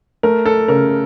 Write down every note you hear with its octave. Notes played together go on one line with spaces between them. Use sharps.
A3 A#4
A4
C#3 A#4